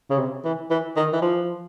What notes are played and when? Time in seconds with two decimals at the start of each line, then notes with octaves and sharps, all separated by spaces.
0.10 C#3
0.19 C3
0.45 E3
0.71 E3
0.96 D#3
1.13 E3
1.22 F3